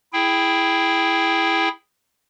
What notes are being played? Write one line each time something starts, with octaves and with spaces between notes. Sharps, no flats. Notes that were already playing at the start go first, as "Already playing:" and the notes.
E4 G#4 G5